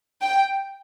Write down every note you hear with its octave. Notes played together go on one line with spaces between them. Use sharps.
G5